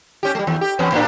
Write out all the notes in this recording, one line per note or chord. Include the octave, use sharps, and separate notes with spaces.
C#4 G4
G3 A3
D#2
G4
E2 B3 C#4
A2 A#3 D4